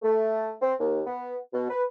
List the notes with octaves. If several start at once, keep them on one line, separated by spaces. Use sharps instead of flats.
A3
C4
D#2
B3
B2
B4